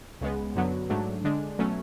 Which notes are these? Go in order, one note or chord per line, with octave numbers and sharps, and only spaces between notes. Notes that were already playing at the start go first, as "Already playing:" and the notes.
C#2 C#3 G#3 B3
F#2 D3 F#3 B3
G#2 F#3 A3 D4
D3 G#3 D4
B2 F#3 A3 C#4